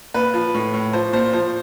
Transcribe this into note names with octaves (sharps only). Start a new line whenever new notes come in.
A#2 B4
F3
A2
A2
F3 C5
A#2 C5
F3 C5